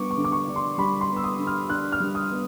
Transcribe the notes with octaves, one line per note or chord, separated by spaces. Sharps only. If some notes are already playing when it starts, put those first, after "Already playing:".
Already playing: G3 B3 D4 C#6 D6
C#6
D3
D6
C#6
D4
C6
G3 B5
C6
B3
E6
D#6
D3
F6
D4 F#6
F6
G3
D#6
B3